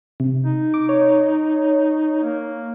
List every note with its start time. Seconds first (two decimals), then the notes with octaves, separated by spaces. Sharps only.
0.20 C3
0.44 D#4
0.74 D6
0.89 C#5
2.23 A#3